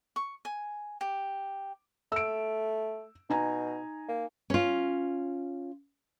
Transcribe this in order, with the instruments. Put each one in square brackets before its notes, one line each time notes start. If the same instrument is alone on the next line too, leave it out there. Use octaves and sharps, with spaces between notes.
[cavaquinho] C#6
G#5
G4
[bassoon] A3 [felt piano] E6 D7
[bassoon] B2 [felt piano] D#4 G#5 A#5
[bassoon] A#3
[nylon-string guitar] C#4 F4